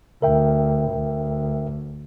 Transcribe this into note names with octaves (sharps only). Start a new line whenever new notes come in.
D2 A#4 E5 G5
D2